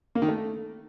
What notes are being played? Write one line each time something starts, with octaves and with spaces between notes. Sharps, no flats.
A#3
D#3
A3